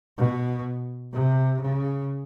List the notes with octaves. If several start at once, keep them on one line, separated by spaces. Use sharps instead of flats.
B2
C3
C#3